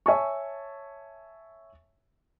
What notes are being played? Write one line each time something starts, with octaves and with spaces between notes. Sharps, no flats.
C#5 E5 G#5 A5 C#6